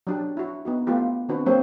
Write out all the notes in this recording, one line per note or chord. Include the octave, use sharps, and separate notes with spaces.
F#3 D4 G4
E4 F#4
B3 D#4 F#4
A3 B3 F4 G4
D#3 C4 D4 F#4 B4
F#3 A#3 C4 G4 C5 C#5